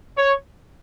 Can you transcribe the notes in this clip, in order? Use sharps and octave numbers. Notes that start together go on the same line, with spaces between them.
C#5